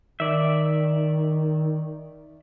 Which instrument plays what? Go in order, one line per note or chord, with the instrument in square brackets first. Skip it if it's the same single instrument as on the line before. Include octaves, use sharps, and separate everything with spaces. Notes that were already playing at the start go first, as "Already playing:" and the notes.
[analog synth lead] D#3 [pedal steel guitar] D5 E5